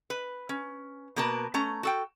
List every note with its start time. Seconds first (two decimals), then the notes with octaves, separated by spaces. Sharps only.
0.10 B4
0.49 C#4
1.16 B2 A#3 A#4 B4 A5
1.54 A3 C#4 A#5
1.83 F#4 A4 G5